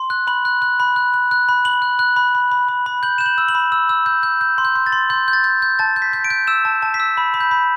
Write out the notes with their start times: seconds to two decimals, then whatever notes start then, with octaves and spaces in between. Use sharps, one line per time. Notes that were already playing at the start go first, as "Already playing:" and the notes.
Already playing: C6
0.10 F#6
0.27 B5 F#7
0.45 F#6
0.62 F#6
0.80 B5
0.96 F#6
1.14 F#6
1.31 F#6
1.49 B5
1.65 B5 F#7
1.82 F#6
1.99 F#6
2.16 B5
2.35 B5
2.51 B5
2.68 B5
2.86 B5
3.03 G6 F#7
3.18 G6 E7
3.26 F#7
3.38 E6
3.49 F#7
3.55 B5
3.72 E6
3.89 E6
4.06 G6
4.23 G6
4.41 G6
4.58 C6
4.65 G6
4.75 C6
4.86 A6
4.92 C6
5.10 C6 G6
5.28 G6
5.33 A6
5.44 G6
5.62 G6
5.79 A5 A6
5.96 G6
6.02 B6
6.13 G6
6.24 D7
6.30 G6
6.47 E6 E7
6.65 A5
6.82 A5
6.94 B6
7.00 E6
7.17 B5
7.34 B5
7.40 G6
7.51 B5